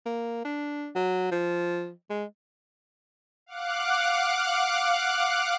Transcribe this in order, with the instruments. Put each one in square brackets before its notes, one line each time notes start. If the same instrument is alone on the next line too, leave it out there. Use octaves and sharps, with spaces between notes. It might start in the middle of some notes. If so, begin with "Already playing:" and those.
[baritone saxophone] A#3
D4
F#3
F3
G#3
[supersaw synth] F5 F#5 D6 F#6